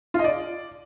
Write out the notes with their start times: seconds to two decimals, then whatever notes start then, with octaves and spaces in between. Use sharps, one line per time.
0.14 F4
0.19 D#5
0.24 D5